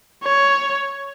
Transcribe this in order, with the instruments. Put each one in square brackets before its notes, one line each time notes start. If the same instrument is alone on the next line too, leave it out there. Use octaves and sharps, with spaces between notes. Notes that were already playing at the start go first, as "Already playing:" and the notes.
[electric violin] C#5